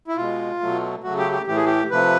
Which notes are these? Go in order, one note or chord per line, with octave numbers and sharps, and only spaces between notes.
E4
B2 G#3 F4
B2 F#3 A3
C#3 F#3 A3 F#4
G4
G4
A2 E3 A3 G4
G#4
G4
C3 F3 A3 B4